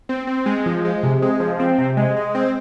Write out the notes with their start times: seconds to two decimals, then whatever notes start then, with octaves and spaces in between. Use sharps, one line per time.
0.09 C4
0.27 C4
0.46 G#3
0.66 F3
0.85 G#3
1.03 C3
1.22 G#3
1.40 F3
1.59 C4
1.78 C3
1.97 G#3
2.16 G#3
2.35 C4